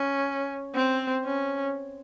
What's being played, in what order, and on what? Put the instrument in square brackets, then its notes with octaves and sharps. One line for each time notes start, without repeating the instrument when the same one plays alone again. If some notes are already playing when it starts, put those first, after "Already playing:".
Already playing: [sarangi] C#4
C4
C#4